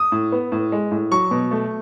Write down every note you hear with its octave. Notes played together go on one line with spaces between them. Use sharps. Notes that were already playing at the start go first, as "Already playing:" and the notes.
Already playing: D#6
A2
B3
A2
G#3
A2
F#3 C#6
B2
A3